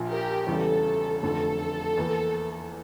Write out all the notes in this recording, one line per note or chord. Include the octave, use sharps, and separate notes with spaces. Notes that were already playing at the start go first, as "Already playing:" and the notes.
Already playing: A#1 A#2 F3
G4 A#4
E1 E2 C#3 E3 G3 A4
F1 F2 D3 A3 A4
E2 E3 A#3